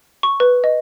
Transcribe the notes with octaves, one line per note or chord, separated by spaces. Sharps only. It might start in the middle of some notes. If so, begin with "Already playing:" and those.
C#6
B4
D#5